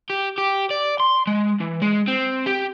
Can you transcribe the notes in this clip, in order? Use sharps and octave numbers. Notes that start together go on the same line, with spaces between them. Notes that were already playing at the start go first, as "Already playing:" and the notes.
G4
G4
D5
C6
G#3
E3
G#3
C4
G4